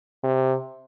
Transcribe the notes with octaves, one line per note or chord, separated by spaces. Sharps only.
C3